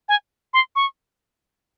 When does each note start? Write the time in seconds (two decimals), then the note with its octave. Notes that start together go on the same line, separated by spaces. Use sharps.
0.09 G#5
0.54 C6
0.76 C#6